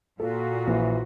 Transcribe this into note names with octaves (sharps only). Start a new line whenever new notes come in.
A#2 F4 F#4 A4
A#1 E3